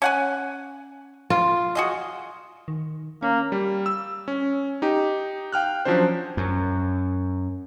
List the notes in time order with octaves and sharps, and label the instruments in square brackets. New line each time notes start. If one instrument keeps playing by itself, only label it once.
[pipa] C#4 F#5 G#5
[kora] F4
[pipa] F#4 G#4 D#5
[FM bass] D#3
[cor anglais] A#3 [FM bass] C#4
[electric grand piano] G3
E6
C#4
D#4 G4
F5 G5 F6 F#6
F3 F#3 C#4 D4 C5
[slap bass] F#2